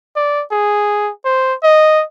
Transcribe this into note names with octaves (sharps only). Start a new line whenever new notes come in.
D5
G#4
C5
D#5